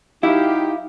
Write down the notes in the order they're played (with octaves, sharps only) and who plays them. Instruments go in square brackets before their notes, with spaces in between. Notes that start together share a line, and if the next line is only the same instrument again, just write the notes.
[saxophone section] F#3 F#4 G4 [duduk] D#4 [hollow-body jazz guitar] E4 [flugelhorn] F5